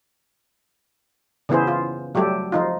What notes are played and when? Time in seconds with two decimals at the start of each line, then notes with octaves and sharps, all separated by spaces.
1.49 C#3 E3 B3 E4 G#4 C5
1.67 F4
2.15 F#3 G3 A3 G4 A4
2.52 F3 D#4 F4